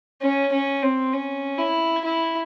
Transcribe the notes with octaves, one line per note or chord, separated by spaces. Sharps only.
C#4
C#4
C4
C#4
E4
E4